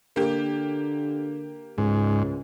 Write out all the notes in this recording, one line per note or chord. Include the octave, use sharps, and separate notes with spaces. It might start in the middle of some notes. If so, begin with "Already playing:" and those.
D3 A#3 G4
C#2 G#2